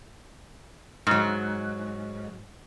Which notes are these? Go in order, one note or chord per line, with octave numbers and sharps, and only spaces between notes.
G#2 F#3